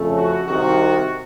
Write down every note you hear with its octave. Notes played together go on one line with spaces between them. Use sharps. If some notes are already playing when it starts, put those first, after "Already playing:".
Already playing: F2 C#3 A3
F#4
C2 C3 D#3 F#4